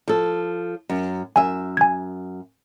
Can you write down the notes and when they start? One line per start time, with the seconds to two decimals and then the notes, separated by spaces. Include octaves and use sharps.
0.08 F3 A4
0.89 F#2
1.36 F#2 E5 G#5
1.77 G#5 G#6